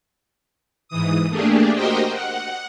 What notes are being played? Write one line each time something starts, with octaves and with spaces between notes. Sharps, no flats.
G#2 E3 D#6
A3 A#3 D4 G4 G#4
F#4 G4 A#4 C5 D#5 G5
F#5